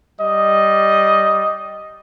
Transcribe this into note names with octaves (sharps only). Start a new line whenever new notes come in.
G3 D#5